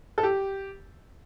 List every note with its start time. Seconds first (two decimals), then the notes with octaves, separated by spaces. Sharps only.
0.18 A4
0.23 G4